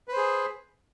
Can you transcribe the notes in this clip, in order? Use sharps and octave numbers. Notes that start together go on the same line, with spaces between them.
G#4 B4 C5